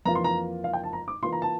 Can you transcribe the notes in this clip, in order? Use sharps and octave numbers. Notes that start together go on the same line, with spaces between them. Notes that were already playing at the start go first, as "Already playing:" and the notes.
F2 E3 A#3 F4 A#5
C6
A#5
F5
G5
A5
A#5
D6
E3 A#3 F4 C6
A#5
A5